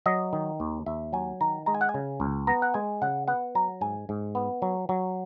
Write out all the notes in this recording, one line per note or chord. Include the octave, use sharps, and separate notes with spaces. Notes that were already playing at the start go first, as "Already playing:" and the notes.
F#3 D#5
D#3
D#2
D#2 E5
F#3 G#5
D#3 A#5
G#3 A#5
G#5
F#5
G#5
C#3
C#2
B3 A#5
F#5
G#3 G#5
C#3 F#5
B3 F#5
F#3 A#5
G#2 G#5
G#2
B3
F#3
F#3